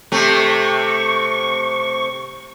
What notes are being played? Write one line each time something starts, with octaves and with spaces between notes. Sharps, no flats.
C3 A3 C#6